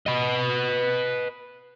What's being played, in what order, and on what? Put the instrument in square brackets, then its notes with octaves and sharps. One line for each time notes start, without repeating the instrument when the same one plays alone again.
[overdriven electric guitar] B4 D#5